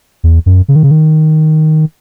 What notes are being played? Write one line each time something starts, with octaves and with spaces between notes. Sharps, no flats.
E2
F#2
C#3
D#3
C#3
D#3